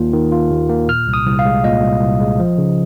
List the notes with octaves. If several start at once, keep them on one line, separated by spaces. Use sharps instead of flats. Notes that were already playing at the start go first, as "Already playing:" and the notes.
Already playing: D#2 D#3 A#3 F4
D#3
F4
D#2
A#3
A#2 F6
C2
D#6
C2
F5
G#3
A#2 D#5
C2
C2
G#3
F3
C#3